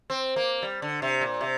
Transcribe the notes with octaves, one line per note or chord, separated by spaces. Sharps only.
C4
A#3
G3
D3
C3
A#2
C3